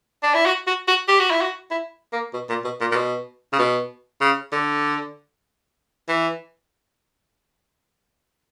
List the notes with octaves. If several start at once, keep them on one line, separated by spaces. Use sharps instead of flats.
D4
E4
F#4
F#4
F#4
G4
F#4
E4
F#4
E4
A#3
B2
A#2
B2
A#2
A#2
B2
C#3
B2
C#3
D3
E3